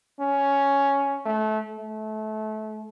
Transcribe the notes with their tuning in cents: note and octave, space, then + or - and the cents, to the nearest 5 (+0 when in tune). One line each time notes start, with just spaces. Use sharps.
C#4 +5
A3 -25
A3 -25